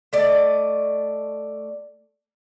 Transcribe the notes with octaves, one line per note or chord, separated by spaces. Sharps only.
A3 D5 D#5